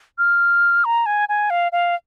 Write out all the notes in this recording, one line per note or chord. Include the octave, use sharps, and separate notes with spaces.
F6
A#5
G#5
G#5
F5
F5